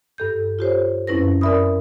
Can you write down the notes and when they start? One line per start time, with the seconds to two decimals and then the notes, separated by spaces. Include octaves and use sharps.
0.18 G2 A4 G6
0.59 F4 G4 C5 C#5
1.07 F#2 C4 C#4 E4 B4 A#6
1.41 A#4 D5 E5 B5 D#6